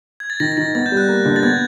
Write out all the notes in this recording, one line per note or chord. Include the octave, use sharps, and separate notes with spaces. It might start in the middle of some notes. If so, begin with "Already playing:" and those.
G#6
A6
D#3 A#6
A6
D#3 A#6
B3 A6
G6
G3
F#6
A#3
D3
A6
B3 G#6